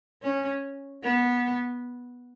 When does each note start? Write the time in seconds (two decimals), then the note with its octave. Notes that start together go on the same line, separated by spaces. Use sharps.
0.22 C#4
1.03 B3